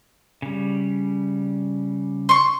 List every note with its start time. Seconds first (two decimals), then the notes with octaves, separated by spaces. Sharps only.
0.42 C#3 G3
2.29 C6 C#6